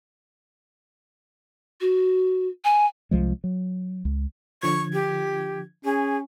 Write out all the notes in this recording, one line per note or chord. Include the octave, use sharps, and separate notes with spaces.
F#4
G#5
C2 F3 G#3
F#3
C#2
D3 F3 C#6 G#6
G4
C#4 G#4